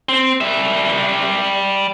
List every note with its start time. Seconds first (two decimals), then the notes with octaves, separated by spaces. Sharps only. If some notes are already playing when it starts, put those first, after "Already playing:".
0.09 C4
0.41 G3 E5